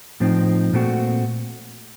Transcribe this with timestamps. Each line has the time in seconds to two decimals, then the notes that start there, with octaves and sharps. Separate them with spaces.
0.20 A2 F3 C4 D#4
0.73 A#2 A3 C4 F#4